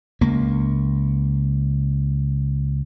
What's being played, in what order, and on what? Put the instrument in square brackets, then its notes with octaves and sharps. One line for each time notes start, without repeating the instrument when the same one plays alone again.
[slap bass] C#2 A#3